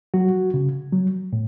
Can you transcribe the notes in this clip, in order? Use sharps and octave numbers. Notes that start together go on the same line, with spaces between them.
F#3 F#4
C#3
F#3
A2